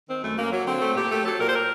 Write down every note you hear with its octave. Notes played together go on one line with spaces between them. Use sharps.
D#3 C4
F#2 A3
F#2 A#3
F#3
D3 C4
A3
A#2 G4
A3
F#3 A4
A#2 A#4
C5
A#4